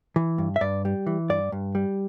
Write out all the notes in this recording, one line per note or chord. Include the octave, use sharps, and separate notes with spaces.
E3
G2
E5
G2 D5
G3
E3
G2 D5
G2
G3